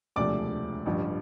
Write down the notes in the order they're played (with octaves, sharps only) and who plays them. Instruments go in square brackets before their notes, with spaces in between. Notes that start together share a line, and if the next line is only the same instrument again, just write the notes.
[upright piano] E1 D2 C3 F3 A3 D5 D6
A1 G2 D3 F3